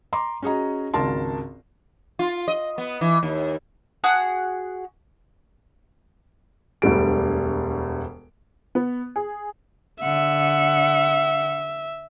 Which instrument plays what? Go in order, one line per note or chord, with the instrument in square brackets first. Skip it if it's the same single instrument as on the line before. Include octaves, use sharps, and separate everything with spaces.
[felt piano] A#5 C6 D6
C#4 F#4 G#4 D#5 A#5
G#1 C#2 F#4 A#4 A5 C6
[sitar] F4
D#5
B3
E3
D#2
[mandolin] F#4 G#4 D#6 F#6
[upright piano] E1 D2 G3 D7
[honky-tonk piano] B3
G#4
[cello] D3 F#5 [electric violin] E5